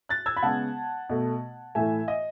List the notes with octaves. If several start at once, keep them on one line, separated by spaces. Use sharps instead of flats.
F#6 A6
E6 G#6
B5
C#3 G#3 B3 F#5 A5
B2 A3
A2 E3 A3 E5 G#5
D#5